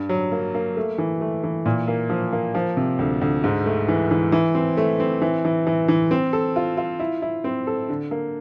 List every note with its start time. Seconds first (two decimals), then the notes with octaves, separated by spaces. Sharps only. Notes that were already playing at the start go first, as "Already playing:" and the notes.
Already playing: G2
0.09 F#3
0.32 A#3
0.55 A#3
0.77 A3
0.98 E3
1.21 A3
1.43 E3
1.66 A#2
1.88 A#3
2.10 F3
2.33 A#3
2.55 F3
2.77 C3
2.99 D2
3.21 D2
3.44 G#2
3.66 A3
3.88 E3
4.11 E3
4.32 E3
4.55 C4
4.77 A3
5.00 C4
5.22 E3
5.45 E3
5.67 E3
5.88 E3
6.11 C4
6.33 A4
6.56 F4
6.77 F4
6.99 E4
7.22 E4
7.44 C4
7.67 A4
7.89 D3
8.11 A#3